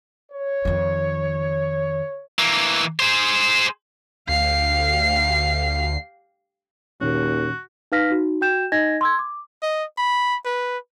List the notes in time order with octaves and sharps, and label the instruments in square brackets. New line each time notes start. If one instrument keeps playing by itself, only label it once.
[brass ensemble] C#5
[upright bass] F2 D#3
[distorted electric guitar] E3 A#3
G#4 C5
[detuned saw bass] D2 [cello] G4 F5 [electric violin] C7
[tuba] D#2 [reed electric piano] A#2 D#3 C#4 [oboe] F#4
[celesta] D#4 B4 F5 F6 A#6 B6
D#4 F#4
F#4 G5 G6 E7
D#4 D#5 G#5 G#6 A#6
C6 E6 G#6
D6
[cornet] D#5
B5
B4